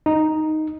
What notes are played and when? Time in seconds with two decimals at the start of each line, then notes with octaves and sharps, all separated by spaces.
0.06 D#4